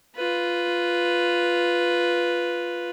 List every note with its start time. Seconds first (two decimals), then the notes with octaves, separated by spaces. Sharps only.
0.16 F4 B4